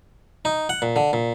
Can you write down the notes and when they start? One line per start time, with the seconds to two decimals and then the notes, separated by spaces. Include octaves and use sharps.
0.45 D#4
0.69 F#5
0.82 A#2
0.96 D3
1.13 A#2